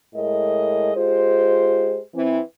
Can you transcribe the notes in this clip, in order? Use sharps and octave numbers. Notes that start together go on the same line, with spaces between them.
A2 G#3 A#4 D#5
G#3 F4 G4 C5
E3 C4